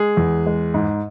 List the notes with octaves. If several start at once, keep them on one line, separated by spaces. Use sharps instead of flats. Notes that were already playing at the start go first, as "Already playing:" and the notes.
Already playing: G#3 G#4
E2
G#3
G#2